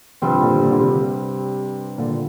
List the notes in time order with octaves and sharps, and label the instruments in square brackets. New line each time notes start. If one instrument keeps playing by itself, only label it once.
[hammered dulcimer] G2 G3 C4 [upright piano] C3 F3
[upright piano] A#2 D3
A#2
D3
C3
A#2 D3